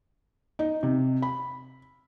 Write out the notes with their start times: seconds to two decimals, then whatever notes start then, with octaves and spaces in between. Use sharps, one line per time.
0.59 D#4
0.83 C3
1.22 B5